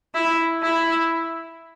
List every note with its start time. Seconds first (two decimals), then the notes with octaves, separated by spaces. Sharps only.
0.14 E4
0.62 E4